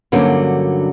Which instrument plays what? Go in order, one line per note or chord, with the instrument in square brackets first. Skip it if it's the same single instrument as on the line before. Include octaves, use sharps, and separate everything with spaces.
[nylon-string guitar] G2 D3 F#3 A#3 C#4